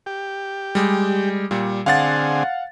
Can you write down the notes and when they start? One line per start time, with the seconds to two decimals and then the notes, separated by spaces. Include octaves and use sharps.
0.06 G4
0.75 G3 G#3
1.51 A#2 G3
1.86 D3 C4 G#4 F5 F#5 A6